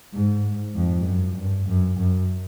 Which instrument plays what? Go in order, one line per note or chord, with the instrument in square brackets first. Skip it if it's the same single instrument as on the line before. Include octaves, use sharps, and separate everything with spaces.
[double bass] G#2
F2
F#2
G2
F#2
F#2